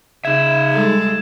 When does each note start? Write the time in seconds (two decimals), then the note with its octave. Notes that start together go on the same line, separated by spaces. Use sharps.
0.25 C#3 D#4 E5 G#6 E7
0.71 G3 G#3 A4